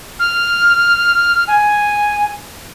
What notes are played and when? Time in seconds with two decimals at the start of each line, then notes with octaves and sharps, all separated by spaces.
0.19 F6
1.48 G#5